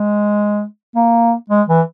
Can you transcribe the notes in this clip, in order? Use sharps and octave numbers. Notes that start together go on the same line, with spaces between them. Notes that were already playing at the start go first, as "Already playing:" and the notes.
Already playing: G#3
A#3
G#3
E3